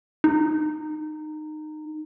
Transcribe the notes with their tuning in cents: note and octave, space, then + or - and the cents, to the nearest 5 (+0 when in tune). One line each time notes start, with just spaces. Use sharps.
D#4 -20